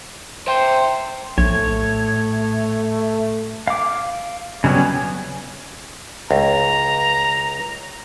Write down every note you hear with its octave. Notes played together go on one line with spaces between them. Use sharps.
C5 E5 G5
A#1 A2 A3 C#5
F5 D6
C#3 F#3 G3 B3 C#4
C#2 A#5